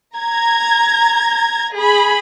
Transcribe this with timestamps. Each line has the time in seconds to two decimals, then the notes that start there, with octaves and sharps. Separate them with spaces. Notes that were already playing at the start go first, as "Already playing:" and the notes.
0.17 A#5 G#6
1.74 G#4 B5